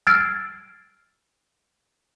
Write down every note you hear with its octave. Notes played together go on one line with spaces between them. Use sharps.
E6 F6 G#6 A6 C7 D7